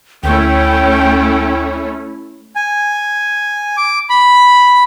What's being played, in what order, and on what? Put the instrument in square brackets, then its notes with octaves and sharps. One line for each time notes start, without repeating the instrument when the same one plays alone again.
[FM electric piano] D2 [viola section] A3 C#4 E4 [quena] G5
[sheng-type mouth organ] G#5
D6
B5